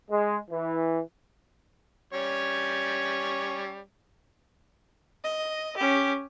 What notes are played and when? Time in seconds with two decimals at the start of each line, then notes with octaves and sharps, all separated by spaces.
0.11 G#3
0.50 E3
2.13 G3 C#4 C#5
5.24 D#5
5.77 C#4 G4